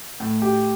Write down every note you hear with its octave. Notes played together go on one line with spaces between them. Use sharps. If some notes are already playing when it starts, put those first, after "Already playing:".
A2
G4